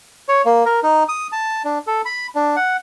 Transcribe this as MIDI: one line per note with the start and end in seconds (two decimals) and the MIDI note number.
0.28 0.42 73
0.45 0.64 58
0.65 0.80 70
0.83 1.03 63
1.09 1.27 87
1.32 1.63 81
1.65 1.79 62
1.87 2.02 69
2.05 2.27 83
2.35 2.56 62
2.56 2.77 78